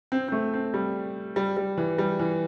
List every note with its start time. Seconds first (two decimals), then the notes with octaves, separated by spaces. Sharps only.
0.12 C4
0.28 C4
0.32 A3
0.54 C4
0.74 G3
1.36 G3
1.57 G3
1.77 E3
1.98 G3
2.20 E3